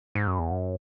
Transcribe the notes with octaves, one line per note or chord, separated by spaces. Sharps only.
G#2
F#2
E2
F#2